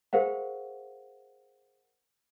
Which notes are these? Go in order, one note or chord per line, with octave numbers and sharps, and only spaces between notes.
G#4 A#4 C5 F5 F#5